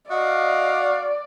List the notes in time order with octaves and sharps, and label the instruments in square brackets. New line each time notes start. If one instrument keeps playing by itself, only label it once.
[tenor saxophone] F#4 [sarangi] D5 [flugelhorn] D#5 [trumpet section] F5